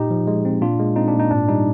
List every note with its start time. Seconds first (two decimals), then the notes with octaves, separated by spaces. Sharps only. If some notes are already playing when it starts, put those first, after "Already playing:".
Already playing: A#2 D#4 G4
0.10 F3
0.27 G#3
0.45 C4
0.62 A#2 D4 F4
0.79 G#3
0.96 C4 D#4
1.08 D4
1.14 A#2
1.20 D#4
1.31 G#2 D4
1.48 G3 D#4